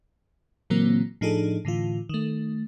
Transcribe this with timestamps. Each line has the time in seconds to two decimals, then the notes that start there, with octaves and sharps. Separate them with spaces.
0.70 A#2 D3 E3 F#3 A#3 C4
1.21 A2 F3 D4 D#4 G#4 A4
1.65 A2 D3 E3 F4
2.09 D#3 A3